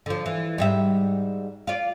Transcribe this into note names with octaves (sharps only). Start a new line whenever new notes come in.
D3 F3
E3
G#2 G3 E5
F4 D5